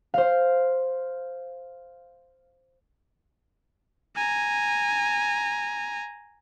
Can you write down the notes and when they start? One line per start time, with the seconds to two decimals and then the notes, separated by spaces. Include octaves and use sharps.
0.14 C5 F5
4.16 G#5 A#5